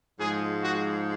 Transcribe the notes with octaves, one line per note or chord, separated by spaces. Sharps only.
G#2 F3 G#3 G#4
F#4